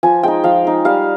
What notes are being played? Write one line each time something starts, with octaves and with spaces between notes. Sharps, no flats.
F3 G#5
G#3 D#4 G5
F3 F5
G#3 D#4
G3 F5